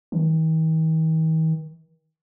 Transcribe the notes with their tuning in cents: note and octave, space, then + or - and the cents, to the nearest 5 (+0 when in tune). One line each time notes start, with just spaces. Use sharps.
D#3 +45